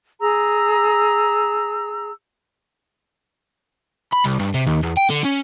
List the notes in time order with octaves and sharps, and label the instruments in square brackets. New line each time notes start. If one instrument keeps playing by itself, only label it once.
[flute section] G#4 A#5 E6
[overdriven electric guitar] B5
C2
G2
C3
D#2
E2
G5
D3
C#4